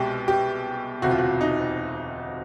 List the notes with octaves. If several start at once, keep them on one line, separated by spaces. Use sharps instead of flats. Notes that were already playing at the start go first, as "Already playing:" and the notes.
Already playing: C2 B2 G#3 G4
G4
E1 D2 C3 F#4
F4
F#4
D#4